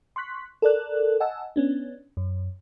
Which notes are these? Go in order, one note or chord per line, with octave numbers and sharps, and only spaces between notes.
C6 C#6 F#6 B6
A4 A#4 D5 F#6
D#5 F#5 G#5 A5 E6
B3 C#4 D4
F#2